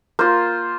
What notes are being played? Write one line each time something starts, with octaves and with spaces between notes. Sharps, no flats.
A#3 F4 C5